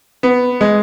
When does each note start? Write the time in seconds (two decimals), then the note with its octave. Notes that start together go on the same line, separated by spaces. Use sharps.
0.23 B3
0.61 G#3